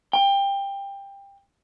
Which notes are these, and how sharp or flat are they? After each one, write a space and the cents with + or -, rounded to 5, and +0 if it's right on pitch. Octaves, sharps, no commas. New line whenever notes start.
G5 +20